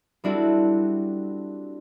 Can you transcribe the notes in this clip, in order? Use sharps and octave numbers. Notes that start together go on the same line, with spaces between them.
G3 C4 D4 E4 F#4 A4